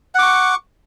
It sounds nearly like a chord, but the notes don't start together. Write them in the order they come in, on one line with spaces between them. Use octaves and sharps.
F#5 D6 C#6